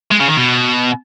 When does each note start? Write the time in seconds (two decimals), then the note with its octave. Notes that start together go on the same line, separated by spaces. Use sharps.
0.11 G#3
0.20 C#3
0.29 D#3
0.37 B2